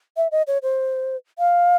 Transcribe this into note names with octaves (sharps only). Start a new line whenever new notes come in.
E5
D#5
C#5
C5
F5